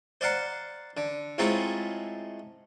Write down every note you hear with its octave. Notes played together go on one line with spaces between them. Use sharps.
C5 D5 F5 F#5 A#5
D3
A2 G#3 A3 C4 F4 A#5